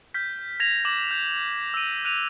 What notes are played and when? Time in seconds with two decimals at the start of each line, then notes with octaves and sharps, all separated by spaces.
0.14 F6 G6 B6
0.60 G#6 A#6 B6 F7
0.85 D6 E7 F#7
1.11 G6
1.74 E6 D#7
2.05 F#6 D#7 F7